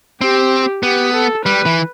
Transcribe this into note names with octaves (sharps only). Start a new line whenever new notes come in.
C4 G4
B3 G4
A4
G3 B4
E3